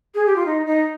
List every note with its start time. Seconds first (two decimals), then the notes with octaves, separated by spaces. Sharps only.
0.15 G#4
0.26 G4
0.36 F4
0.46 D#4
0.67 D#4